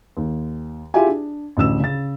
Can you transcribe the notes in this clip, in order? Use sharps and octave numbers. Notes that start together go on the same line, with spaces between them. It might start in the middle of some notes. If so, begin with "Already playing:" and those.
D#2
E4 F4 G4 G#4 E5 G#5
D4
A1 D2 E6 E7
C#3 A6